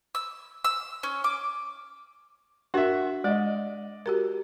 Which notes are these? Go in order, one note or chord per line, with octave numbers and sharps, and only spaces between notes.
E6
E6
C#4
D6
D4 F#4 A#4 E5
G#3 D5 D#5
F#4 G4 A#4